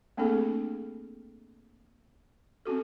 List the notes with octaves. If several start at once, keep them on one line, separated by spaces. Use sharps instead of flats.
A3 A#3 C4 D4 G#4 A4
C4 C#4 F#4 A4